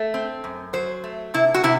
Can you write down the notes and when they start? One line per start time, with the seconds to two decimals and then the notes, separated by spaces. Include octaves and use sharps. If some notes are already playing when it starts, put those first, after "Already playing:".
Already playing: A3
0.14 C4
0.44 F#2
0.73 F#3 C5
1.04 A3
1.34 C3 E4
1.54 F#4
1.63 C3 E4